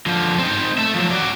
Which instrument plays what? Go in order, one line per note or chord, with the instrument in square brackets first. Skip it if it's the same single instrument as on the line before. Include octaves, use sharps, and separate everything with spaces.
[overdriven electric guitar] D3 F3
C4 D#4
A3 E5
F3 F#3
F#4 D5